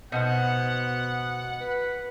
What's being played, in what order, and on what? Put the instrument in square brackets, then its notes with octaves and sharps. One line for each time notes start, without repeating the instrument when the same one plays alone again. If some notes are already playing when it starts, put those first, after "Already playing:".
[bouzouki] B2 [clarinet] B3 [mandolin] D#4 F#4 C5 [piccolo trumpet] F#5
[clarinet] B4